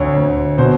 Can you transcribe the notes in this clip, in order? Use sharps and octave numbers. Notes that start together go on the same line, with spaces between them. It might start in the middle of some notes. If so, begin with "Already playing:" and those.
Already playing: D2 D3 C#5
D2
B2 C5